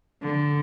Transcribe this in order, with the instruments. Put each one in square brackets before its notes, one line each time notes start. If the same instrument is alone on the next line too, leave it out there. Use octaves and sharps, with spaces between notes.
[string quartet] D3